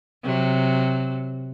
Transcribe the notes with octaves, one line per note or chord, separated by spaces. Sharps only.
C3 F#3